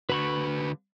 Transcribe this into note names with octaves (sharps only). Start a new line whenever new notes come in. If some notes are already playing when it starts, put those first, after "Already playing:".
D3 F#4 B4 B5 C#6